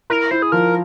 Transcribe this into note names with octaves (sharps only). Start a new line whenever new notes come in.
E4 A#4
E4 C5
G#4
F3 A#4